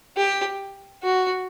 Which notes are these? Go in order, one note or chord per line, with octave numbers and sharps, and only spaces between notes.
G4
F#4